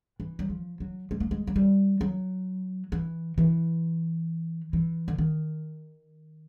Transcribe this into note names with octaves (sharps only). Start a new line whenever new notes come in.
E3
F#3
F3
F#3
G#3
A3
G#3
F#3
G3
F#3
E3
E3
E3
D3
D#3